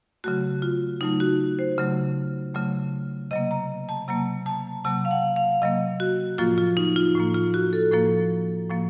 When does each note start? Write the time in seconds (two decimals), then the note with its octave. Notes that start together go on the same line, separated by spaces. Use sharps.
0.24 C#3 F#3 A3 F#4
0.62 F4
1.01 C#3 F#3 A3 D#4
1.20 F#4
1.59 C5
1.78 C#3 F#3 A3
2.54 C#3 F#3 A3
3.31 C3 F#3 A#3 D#5
3.51 A#5
3.89 A5
4.08 C3 F#3 A#3 A#5
4.46 A5
4.85 C3 F#3 A#3 A5
5.05 F5
5.11 F#5
5.36 F5
5.62 C3 F#3 A#3 D#5
6.00 F#4
6.38 A2 F3 A#3 F4
6.58 F4
6.77 D#4
6.96 F4
7.15 A2 F3 A#3
7.34 F4
7.54 F#4
7.73 A4
7.92 A2 F3 A#3 A4
8.69 A2 F3 A#3